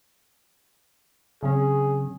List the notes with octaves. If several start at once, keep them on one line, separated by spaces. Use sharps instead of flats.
C#3 F#3 C4 G#4